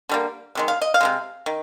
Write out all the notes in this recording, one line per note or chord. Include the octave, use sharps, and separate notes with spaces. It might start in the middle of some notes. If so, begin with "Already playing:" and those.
D3 G3 A#3
C3 D#3 G#3
F5
D#5
F5
C3 D#3 G#3
D#3